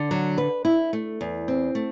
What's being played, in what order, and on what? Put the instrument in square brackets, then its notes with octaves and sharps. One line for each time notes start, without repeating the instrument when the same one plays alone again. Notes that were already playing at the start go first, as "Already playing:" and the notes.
Already playing: [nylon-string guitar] D3
F#3
B4
E4
A3
E2
C4
A3